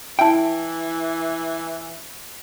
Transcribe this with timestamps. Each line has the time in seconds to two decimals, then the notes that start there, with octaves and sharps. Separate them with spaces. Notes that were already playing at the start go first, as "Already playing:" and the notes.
0.19 E3 E4 E5 G5 A5